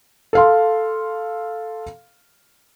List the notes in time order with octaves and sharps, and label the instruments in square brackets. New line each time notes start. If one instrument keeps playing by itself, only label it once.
[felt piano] A4 F5 C6